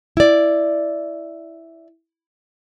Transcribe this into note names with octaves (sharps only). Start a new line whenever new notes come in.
E4 D5